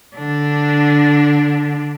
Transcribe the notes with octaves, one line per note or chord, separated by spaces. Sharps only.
D3 D4